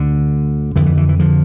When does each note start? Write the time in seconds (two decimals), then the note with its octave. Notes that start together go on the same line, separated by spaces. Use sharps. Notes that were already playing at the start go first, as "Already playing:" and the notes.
Already playing: D2 D3
0.76 F2 D3 E3
0.86 E3
0.97 E3
1.09 E3
1.19 D3 F3